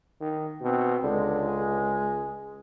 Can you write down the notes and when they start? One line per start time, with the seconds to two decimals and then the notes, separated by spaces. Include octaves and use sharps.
0.21 D#3
0.62 B2 C4
1.03 C#2 D3 G#3
1.48 G#4